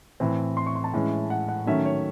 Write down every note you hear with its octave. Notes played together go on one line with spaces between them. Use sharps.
A2 E3 C4
C6
C#6
C6
A5
A2 E3 G#3 C#4
F#5
F#5
D#3 F#3 A3 C#4 E5
C#5